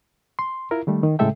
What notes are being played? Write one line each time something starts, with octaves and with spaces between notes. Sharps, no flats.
C6
E4 F4 A#4
D#3 G3 A3
D#3
A2 C#3 G#3 A4 E5 G5